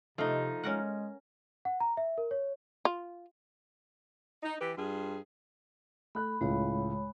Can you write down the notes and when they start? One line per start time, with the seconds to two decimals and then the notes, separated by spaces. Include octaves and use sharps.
0.18 C3 F3 A3 D#4
0.64 G#3 C#4 A#4 F#5
1.65 F#5
1.80 A#5
1.97 E5
2.18 A#4
2.31 C#5
2.85 F4
4.43 D#4
4.60 E3 G4 B4
4.76 G2 F4 G#4
6.15 A3 B5 F#6
6.41 C#2 A2 G#3 C#5 B5